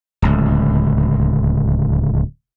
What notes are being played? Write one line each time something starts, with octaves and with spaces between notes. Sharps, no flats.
D1 C#2